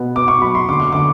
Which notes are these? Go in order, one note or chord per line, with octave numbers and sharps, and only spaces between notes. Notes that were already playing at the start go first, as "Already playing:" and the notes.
Already playing: B2 B3
B3 D6
C#6
F#3 B5
C6
D3 D6
C#6
D3 D6